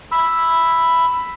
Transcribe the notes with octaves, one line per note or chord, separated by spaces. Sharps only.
B5 E6